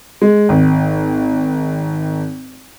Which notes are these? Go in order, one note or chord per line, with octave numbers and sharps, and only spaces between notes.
G#3
G#1